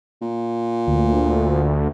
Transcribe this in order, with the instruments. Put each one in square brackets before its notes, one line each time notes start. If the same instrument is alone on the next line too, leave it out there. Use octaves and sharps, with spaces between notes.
[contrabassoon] A#2
[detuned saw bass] D2